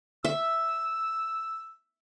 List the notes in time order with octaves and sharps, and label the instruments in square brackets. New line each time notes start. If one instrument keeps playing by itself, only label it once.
[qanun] E5 [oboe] E6